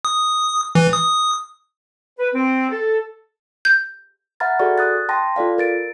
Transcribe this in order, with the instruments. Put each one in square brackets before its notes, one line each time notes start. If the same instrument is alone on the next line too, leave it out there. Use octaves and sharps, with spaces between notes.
[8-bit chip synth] D#6
E3
D#6
[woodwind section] B4
C4
A4
[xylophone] G6
[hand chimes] E5 F#5 A#5 B5 F6 A6
F#4 G#4 A4 D5 C#6
D#6 F#6 A6
G5 A5 C6 A#6
F4 A4 D5 F5
A#4 A6 D7